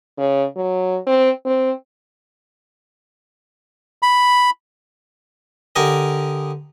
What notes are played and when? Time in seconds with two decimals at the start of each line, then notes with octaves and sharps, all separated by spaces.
0.18 C#3
0.57 F#3
1.07 C4
1.46 C4
4.03 B5
5.76 D3 G4 A#4 D#5 G#5